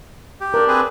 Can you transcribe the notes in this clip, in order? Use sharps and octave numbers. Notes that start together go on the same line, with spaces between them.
G4
D4 A#4
C4 G#4 B4